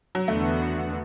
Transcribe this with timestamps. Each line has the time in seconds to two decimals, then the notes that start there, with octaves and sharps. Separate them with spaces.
0.15 F#3
0.28 E2 D3 A3 B3 F#4